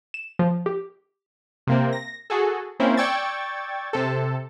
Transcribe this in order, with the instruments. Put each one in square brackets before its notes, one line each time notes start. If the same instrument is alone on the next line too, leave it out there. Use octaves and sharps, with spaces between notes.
[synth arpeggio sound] E7
F3
G4
[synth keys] C3 A#3 C4
A#6
F#4 G#4 A4
A#3 C4 C#4 E4
D5 G5 C#6 E6 G#6 A6
C3 A4